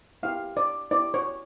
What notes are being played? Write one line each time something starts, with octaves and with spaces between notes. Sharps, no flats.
B3 E4 G4 F5
D5
B3 E4 G4 D5
C#5